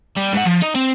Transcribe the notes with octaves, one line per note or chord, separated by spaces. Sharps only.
G3
G#2 F#5
F3
D#4
C4